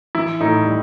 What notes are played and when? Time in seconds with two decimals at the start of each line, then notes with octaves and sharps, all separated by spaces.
0.15 E3 E4
0.40 A2 D#4
0.65 G3